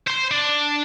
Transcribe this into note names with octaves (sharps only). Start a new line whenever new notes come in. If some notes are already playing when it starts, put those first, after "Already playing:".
C5 C6
D4